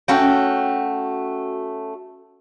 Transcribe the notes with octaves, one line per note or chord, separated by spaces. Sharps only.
A3 C#4 F#4 G5